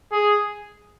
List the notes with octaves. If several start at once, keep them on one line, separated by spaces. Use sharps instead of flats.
G#4